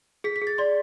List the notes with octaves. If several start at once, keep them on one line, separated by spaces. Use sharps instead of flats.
G#4 B6
B6
G#4
A6
D5 C6